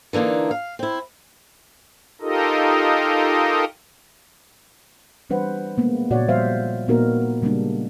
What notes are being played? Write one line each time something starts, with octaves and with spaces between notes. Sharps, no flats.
D3 E3 A#3 D4 D#4
F5
C4 E4
D#4 F4 G4 A4 A#4 D#5
E3 G3 D4 B4 C5 F#5
G#3 A#3 B3
A#2 C#3 F#4 C#5 D5 F#5
F3 G3 C5 E5 F5
A#2 A#3 B3 D#4 F#4 A#4
C#3 G3 G#3 A#3 D4